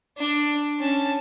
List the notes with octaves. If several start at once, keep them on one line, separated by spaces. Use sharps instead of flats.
D4
C#4 A5